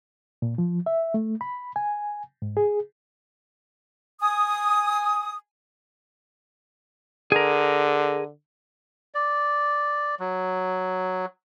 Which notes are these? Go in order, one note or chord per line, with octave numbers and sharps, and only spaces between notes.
A#2
F3
E5
A3
B5
G#5
G#2
G#4
G#5 D#6
D3 G#4 A#4
D5
F#3